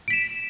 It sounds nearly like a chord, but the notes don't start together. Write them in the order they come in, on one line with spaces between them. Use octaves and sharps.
D7 B6 E7